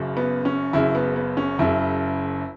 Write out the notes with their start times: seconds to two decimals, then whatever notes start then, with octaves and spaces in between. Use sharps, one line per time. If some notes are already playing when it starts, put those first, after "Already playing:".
Already playing: F#1 F#2 C#3
0.17 B3
0.45 C#4
0.73 F#1 F#2 C#3 E4
0.95 B3
1.16 B3
1.37 C#4
1.59 F#1 F#2 C#3 E4